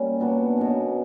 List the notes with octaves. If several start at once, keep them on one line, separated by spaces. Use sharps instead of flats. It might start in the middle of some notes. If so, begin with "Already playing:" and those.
Already playing: G3 A#3 C#4
A#2 F#3 B3 D4
B2 F#3 A#3 C#4